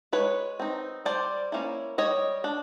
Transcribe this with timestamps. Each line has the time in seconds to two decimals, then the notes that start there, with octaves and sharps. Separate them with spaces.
0.13 G#3 B4 C#5
0.60 C4 D#4
1.05 G3 C5 D5
1.52 A#3 C#4 E4
1.98 G3 C#5 D#5
2.44 D4